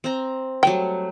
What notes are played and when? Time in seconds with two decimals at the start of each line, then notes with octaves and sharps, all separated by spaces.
0.04 C4 A#5
0.63 F#3 G3 A3 G5